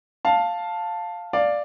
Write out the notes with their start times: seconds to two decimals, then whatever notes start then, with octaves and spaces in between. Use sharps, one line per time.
0.25 F5 A5
1.33 D5 F5